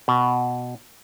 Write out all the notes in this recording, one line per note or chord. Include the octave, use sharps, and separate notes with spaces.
B2